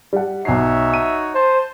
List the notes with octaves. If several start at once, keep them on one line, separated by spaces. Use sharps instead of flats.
G3 F#5
B1 D#4 F#4 C#5 E5 C7
D#7
C5 A5